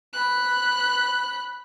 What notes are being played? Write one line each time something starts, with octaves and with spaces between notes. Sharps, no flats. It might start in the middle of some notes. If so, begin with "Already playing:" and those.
B5 F#6